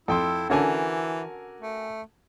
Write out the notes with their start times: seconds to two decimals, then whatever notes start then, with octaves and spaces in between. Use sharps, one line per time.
0.08 F2 E4 A4 G5 C6
0.50 D3 E3 C#4 F#4 A#4 G#5
1.60 A3